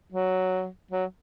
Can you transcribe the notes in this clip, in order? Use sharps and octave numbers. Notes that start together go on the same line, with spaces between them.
F#3
F#3